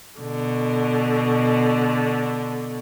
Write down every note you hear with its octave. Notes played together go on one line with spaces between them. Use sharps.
B2 D3